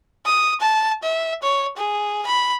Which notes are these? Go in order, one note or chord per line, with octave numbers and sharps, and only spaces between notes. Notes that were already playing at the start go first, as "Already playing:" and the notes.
D#6
A5
E5
C#5
G#4
B5